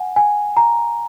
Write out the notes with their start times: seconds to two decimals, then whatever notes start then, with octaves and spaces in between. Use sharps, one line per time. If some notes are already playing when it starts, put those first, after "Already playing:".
Already playing: F#5 G#5
0.16 G#5
0.57 A#5